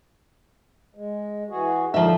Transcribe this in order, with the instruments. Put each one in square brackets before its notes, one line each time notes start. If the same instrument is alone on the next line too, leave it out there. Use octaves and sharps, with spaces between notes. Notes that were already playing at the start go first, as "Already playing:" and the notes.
[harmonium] G#3
E3 F#4 G#4
[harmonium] A2 D3 D#4 [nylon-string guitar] F3 E5